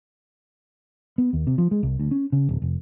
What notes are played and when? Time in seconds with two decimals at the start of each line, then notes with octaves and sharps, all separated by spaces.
1.18 B3
1.33 D#2
1.47 C3
1.58 F3
1.71 G#3
1.83 C2
1.99 D2
2.11 C#4
2.32 C#3
2.49 D1
2.62 F1